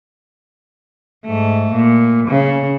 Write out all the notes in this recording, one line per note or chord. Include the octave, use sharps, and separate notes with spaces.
G#2 A3
A#2
C#3